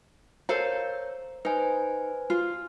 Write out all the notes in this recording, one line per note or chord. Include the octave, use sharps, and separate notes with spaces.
A4 A#4 C5 C#5 F5 A#5
D#4 B4 C5 G#5
F4